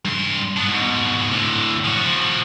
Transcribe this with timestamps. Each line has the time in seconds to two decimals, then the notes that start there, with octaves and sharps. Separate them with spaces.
0.05 G2 C6
0.57 B3 D4
0.69 G#2 B2
1.31 A2 D3
1.85 F3 F#4